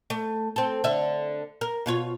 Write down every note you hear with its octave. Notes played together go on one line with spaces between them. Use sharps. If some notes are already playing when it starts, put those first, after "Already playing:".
A3
C4 A4
D3 E5
A#4
B2 F4 C#5